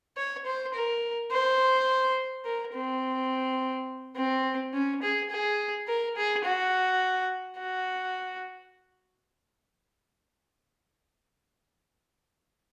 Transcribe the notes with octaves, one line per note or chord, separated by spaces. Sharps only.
C#5
C5
A#4
C5
A#4
C4
C4
C#4
G#4
G#4
A#4
G#4
F#4
F#4